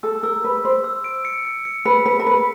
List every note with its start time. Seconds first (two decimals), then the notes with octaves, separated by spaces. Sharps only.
0.03 A4 E6
0.23 A#4 E6
0.44 B4 E6
0.64 C5 E6
0.84 E6
1.04 D7
1.25 C#7
1.45 C#7
1.65 C#7
1.85 B4 C#7
2.06 B4 B5
2.20 A#4
2.26 B4 B5